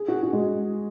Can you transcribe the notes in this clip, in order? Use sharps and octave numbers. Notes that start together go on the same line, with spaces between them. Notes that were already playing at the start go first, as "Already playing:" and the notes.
Already playing: G#4
F#4
F#4
G#3